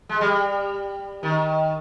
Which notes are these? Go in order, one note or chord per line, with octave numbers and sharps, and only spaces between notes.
G#3
G3
D#3